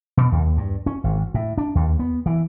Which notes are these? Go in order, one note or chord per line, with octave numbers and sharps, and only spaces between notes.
B2
D#2
G2
C#4
G#1
A2
D4
D#2
B3
E3